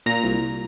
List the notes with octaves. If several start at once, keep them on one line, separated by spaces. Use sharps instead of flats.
A#2 A#5
C2